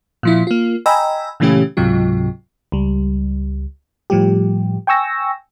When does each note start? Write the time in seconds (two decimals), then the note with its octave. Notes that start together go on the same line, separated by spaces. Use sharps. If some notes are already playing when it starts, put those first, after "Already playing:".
0.23 A#2 F3 E4
0.47 A#3 F4
0.86 D#5 G5 G#5 A#5 B5 E6
1.40 A#2 C#3 E3 A3 C#4 G4
1.77 C#2 G#2 C3 F#3 F4
2.72 C#2 G3
4.10 A2 F3 G3 G4
4.87 G5 G#5 C#6 E6 A#6